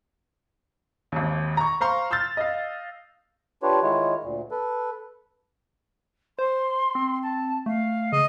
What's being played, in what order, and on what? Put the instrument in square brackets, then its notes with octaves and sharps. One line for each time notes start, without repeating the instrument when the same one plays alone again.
[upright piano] G#1 D#2
A#5 C#6
C5 F5 A#5 C6 C#6
C6 E6 F6 G6 A6
D#5 F5
[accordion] D4 F4 G4 B4 C#5
D#3 G#3 E4 F4 C#5
D2 A#2
A4 B4
[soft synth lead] C5 [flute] C6
[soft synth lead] C4
[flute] A5
[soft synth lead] A3 [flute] F5
[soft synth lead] C#3 [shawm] D#5